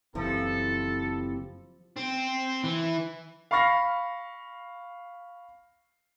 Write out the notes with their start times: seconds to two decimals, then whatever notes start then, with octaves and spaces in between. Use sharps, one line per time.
0.15 F#1 E3 F3 C4 E4 G4 A4
1.97 C4
2.64 E3
3.51 F5 B5 C#6 F6 A#6 C7